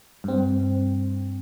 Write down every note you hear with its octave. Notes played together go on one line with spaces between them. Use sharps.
G2 C4